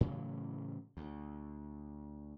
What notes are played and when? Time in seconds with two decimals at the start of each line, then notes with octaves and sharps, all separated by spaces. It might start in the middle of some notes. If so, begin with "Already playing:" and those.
0.01 A2 C#3 E3 F#3
0.97 D2